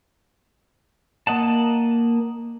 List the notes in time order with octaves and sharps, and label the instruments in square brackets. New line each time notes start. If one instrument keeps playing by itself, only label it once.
[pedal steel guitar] A#3 D#5 F#5 A5